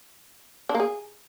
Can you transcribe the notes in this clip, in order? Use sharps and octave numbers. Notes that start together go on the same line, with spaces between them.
D4
A#3
G#4